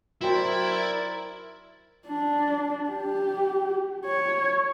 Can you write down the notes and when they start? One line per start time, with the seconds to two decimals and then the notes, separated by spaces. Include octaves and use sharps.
0.21 F#3 E4 A#4 C5 D5 G5
2.07 D4
2.89 G4
4.05 C#5